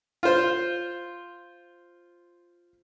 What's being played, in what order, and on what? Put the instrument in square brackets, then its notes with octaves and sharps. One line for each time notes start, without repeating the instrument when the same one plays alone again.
[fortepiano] F4 C5